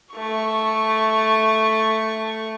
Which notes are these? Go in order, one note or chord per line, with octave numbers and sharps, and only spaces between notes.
A3 C#6